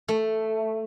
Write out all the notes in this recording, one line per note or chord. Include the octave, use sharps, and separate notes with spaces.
A3